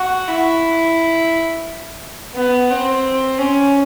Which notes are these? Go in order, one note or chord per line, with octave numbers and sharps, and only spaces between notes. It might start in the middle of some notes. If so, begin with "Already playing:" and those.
Already playing: F#4
E4
B3
C4
C#4